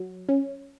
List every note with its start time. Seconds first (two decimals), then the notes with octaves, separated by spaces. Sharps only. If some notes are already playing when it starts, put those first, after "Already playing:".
Already playing: F#3
0.29 C#4